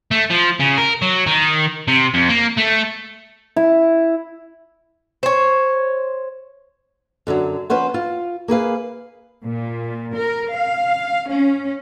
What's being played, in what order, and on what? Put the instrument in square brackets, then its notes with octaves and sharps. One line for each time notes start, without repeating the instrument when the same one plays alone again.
[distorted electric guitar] A3
F3
C#3
A#4
F#3
D#3
C3
F2
A#3
A3
[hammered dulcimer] E4
[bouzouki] C5 C#5
[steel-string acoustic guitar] F#2 D3 F3 F#3
F3 C#4 B4 C5 F#5
F4
A#3 G#4 B4 F5
[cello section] A#2
A#4
F5
C#4